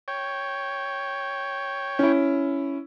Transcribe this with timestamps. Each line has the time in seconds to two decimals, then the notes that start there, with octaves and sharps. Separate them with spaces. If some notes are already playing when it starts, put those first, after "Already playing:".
0.08 C#5 G5
1.99 C#4 E4